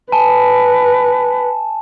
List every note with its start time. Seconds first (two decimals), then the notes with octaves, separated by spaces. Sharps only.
0.12 B4 G#5 A5